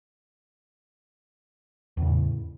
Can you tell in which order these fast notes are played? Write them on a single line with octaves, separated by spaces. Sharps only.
E2 C#3 A2